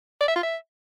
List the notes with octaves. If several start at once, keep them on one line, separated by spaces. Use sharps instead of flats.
D5
E5
F4
E5